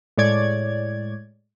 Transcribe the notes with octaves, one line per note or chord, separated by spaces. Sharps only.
A2 G#3 C#5 D5 G#6